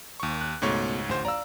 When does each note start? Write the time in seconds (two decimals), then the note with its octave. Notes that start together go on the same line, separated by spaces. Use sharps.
0.20 D#2 C#6
0.41 F#6
0.62 C#2 G#2 B2 A3 C#5
1.09 A1 D2 C5
1.25 D5 F5 A#5 E6